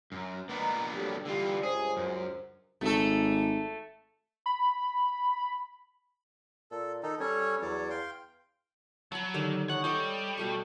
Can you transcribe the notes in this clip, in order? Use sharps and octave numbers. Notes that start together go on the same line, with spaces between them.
F#2
A#3 B3 D4 B4 D#5 A#5
D3 F#3 G3
D3 E3 G3 F4
C#2 G2 G#4 C5
F#2
G#1 A3 A4
B5
A#2 A4
D#3 D#4 A4
G3 C#4 A4 C#5
E2 F#3 C#5 D5
F5 G5 C6
F#3 A5 B5
D3 D#3 G4
D#4 C#5 F#5
G3 A4 D#5 D6
B2 A3 C#6